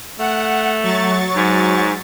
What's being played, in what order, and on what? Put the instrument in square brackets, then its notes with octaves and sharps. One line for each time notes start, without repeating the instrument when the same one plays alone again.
[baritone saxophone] A3 [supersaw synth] F#5
[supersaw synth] F#3 C#6 A6
[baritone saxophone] G#2